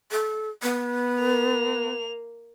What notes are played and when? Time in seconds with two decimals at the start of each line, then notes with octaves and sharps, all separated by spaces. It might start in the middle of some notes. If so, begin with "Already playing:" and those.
0.12 A4
0.63 B3
1.20 A#3 F7